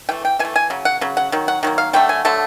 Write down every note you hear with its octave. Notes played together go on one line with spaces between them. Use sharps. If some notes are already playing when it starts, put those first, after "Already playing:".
E3 A3 G5
G5
E3 G#5
A3
G#5
C#3 F#3
F#5
C#3 F#3
F#5
D#3 F#3
F#5
D#3 F#3 A#3
F5
D3 F#3 A3 G5
G#5
D3 F#3 A3 A5